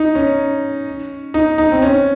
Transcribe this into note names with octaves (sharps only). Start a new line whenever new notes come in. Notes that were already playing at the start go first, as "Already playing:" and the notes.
Already playing: D#4
C#4
D#4
D#4
C4
C#4